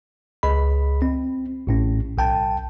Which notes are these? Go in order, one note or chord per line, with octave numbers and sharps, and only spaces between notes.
C#2 G#4 D#5 B5
C4
A1 A2 C#4
B1 G5 A5